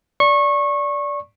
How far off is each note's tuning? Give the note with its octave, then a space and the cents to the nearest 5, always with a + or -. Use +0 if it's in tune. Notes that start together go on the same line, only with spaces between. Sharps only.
D5 -15 C#6 -25